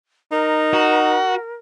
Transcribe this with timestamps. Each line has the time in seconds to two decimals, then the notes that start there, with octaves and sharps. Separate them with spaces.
0.32 D#4 A#4
0.73 F#4